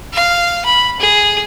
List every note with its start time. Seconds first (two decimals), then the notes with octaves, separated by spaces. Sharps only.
0.13 F5
0.65 B5
0.99 G#4